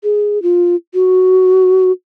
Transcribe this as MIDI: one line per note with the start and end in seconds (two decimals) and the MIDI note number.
0.03 0.42 68
0.42 0.76 65
0.94 1.92 66